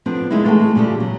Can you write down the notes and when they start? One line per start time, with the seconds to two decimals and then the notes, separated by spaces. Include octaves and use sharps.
0.06 F3 B3 C4 D4 A4
0.31 F#2 C#3 G#3 A#3 D#4 E4
0.45 E3 G#3 A3 F#4 G#5 A5
0.75 A#2 C#3 G3 A4
1.00 F#3